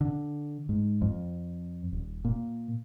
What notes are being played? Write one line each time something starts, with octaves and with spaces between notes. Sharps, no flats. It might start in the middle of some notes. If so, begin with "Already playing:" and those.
D3
G#2
F2
D#1
A#2